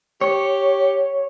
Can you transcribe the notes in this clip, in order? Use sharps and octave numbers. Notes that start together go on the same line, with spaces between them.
G4 C#5